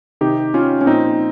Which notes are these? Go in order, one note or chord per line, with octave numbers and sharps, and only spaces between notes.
C3 D#3 D#4 G4
C#4 F4
C#4
A#2 F3 C4 D#4